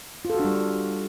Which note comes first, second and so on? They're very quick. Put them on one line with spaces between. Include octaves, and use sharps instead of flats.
F4 A4 F#4 D4 G3